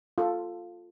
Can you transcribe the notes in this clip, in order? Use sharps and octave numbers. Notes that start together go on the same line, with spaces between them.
F4 A4